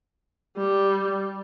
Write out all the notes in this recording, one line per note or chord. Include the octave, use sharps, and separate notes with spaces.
G3